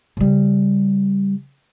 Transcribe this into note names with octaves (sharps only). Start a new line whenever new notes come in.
C#3 G3